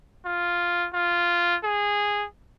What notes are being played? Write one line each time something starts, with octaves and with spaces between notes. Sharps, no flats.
F4
F4
G#4